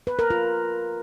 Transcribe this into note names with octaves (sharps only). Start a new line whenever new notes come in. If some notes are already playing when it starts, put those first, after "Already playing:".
B4
A#4
F4